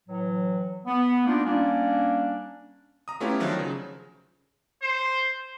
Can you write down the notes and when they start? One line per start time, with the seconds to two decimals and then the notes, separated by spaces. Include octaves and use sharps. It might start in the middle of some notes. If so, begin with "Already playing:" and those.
0.08 A2 E3 F#3
0.85 B3
1.25 A#3 D4 D#4 F4
1.44 G3 A#3 C#4 D4
3.08 A#5 D#6
3.20 A3 B3 C#4 E4 F4 G4
3.40 D3 D#3 F3 F#3
3.59 C#3
4.82 C5